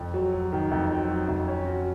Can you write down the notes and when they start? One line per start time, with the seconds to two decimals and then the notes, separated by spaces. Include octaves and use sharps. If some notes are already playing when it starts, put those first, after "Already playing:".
Already playing: F2
0.14 F#3
0.33 F#3
0.53 D#3
0.71 F2
0.90 F#3
1.09 F#3
1.28 F2
1.48 C#4
1.66 F#4